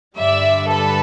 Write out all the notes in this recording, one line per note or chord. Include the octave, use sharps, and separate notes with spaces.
G2 D3 G3 D5 E5
A4 B4